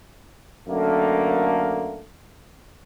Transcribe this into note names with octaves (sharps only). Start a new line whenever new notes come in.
F#2 D3 A3 A#3